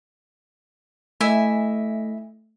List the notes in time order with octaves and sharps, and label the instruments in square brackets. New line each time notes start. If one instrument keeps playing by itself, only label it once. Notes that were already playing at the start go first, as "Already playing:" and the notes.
[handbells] A3 D#5 [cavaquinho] E4 E5 G#5